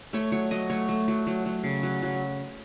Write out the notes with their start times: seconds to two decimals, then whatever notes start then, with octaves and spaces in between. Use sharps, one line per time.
0.13 A3 C#5
0.32 F#3 C#5
0.51 F#3 D#5
0.70 A3 C#5
0.89 A3
1.08 F#3
1.27 F#3
1.46 F#3
1.64 C#3
1.83 F#3
2.02 F#3